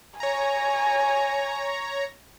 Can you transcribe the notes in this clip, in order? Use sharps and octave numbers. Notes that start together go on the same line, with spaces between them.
C#5 G#5 A#5